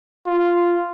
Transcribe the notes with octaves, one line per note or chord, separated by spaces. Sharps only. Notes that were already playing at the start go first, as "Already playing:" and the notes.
F4